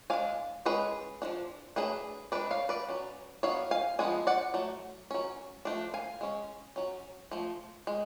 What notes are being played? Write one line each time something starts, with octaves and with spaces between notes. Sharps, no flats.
G#3 D4 F5 G#5
G#3 C#4 G#4 B4
F3 A3 D4
F#3 A3 D4 G#4 B4
G#3 D4 B4 D5
C#5 F5
B4 D5
F#3 C#4
F#3 B3 D4 C#5 F5
F5 G#5
F3 G#3 B3 D4 G#5
D5 F#5
F#3 A3
F#3 C#4
F3 A3 D4
F5 G#5
G#3 C#4
F#3 C#4
F3 A3
G#3